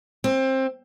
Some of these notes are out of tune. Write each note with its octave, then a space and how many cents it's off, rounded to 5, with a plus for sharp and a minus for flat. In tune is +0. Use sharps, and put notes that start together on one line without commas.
C4 +20